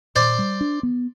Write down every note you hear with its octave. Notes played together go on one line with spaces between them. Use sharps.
A#2 C5 D5
G3
D4
B3